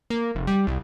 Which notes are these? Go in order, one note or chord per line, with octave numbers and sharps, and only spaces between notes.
A#3
F1
G3
C2